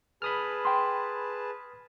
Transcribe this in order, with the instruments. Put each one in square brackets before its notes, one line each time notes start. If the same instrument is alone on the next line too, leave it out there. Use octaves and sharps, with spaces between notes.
[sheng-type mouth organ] G#4 B4 A5 [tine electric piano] B5 D#6 F6
[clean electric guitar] G5 C6